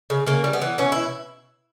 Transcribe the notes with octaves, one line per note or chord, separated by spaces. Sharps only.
C#3
C#3 A#3
G3
B3
E3
B2 C#4
E4